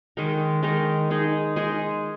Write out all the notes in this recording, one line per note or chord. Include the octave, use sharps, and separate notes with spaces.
D#3 G#3 D#4 A#4
D#3 G#3 D#4 A#4
G#3 D#4 G#4
G#3 D#4 G#4